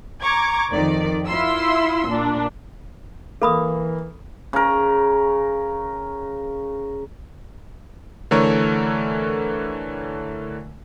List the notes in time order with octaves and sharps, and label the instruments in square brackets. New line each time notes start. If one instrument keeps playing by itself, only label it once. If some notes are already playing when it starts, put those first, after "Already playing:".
[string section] A#5 C#6 D6 G#6
F2 D#3 D5
E4 F4 C6 E6
A#2 D4
[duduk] E3 [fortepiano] A#3 [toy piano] A4 B5 D#6
[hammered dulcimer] C#3 A#4
[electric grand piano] D3 E3 A3 A4 A#4 C#5